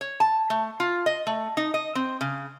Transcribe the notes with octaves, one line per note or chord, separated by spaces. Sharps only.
C#5
A5
A3
F4
D#5
A3
D#4
D#5
C4
C#3